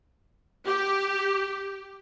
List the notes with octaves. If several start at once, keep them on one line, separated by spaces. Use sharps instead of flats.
G4